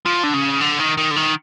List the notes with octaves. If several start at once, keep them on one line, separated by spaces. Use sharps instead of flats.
F3
D3
C#3
D3
D#3
D#3
D3
D#3